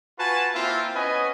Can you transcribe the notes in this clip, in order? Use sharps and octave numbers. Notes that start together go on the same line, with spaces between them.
F4 F#4 B4 G#5 A5
A#3 C4 E4 F4
B3 C#4 B4 D#5 G#5